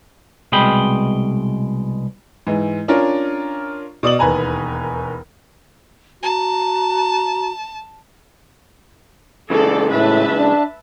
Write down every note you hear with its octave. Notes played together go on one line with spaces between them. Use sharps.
C2 B2 G#3 D#5 G5 B5
G#2 E3
C#4 D4 F4 A#4 C#5
B2 D5 D#6 F#7
E1 D#2 B4 G#5 A#5
F#4 A5 A#5
C#3 E3 G#3 A4 D5
A2 B4 E5 A5
D4